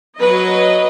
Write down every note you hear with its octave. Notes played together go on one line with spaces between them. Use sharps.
F#3 B4 D#5